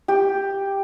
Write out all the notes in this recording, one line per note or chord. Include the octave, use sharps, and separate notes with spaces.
G4